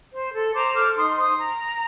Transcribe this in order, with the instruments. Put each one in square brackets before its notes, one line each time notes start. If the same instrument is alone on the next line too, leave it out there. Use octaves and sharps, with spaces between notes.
[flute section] C5
A4
C5 A#5 D6
A4 D6 F6
D#4 C6 D#6
C5 C6 D#6
A#5